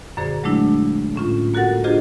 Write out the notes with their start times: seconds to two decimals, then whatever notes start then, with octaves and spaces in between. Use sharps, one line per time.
0.17 F#2 A#2 D3 G#4 C5
0.43 F#3 G#3 A3 D4 E4
1.16 A2 C#4 F4
1.54 A#3 F#4 A4 A#4 F#5 A6
1.84 D4 F4 G4 G#4 C5 D#5